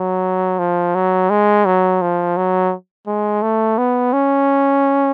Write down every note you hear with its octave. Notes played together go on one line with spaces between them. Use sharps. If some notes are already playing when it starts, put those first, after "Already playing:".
Already playing: F#3
F3
F#3
G#3
F#3
F3
F#3
G#3
A3
B3
C#4